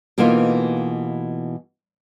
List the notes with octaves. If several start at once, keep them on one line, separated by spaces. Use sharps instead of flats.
B2 E3 A3 A#3 D#4 F4